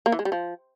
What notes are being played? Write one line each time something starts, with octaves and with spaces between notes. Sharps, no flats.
A#3
E3
G#3
G3
F3